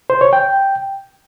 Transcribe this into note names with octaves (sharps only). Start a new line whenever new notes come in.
C5
C#5
G5